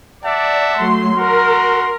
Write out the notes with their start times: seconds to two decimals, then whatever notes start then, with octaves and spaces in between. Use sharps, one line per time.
0.25 D5 E5 F#5 A5
0.77 F#3 A3 C6
1.17 F#4 A#4 C6